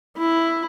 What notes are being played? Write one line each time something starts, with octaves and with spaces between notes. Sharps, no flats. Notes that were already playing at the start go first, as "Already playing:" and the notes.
E4